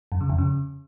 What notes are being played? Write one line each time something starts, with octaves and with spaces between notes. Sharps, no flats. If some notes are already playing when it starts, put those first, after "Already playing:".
F#2
C#3
F2
C#3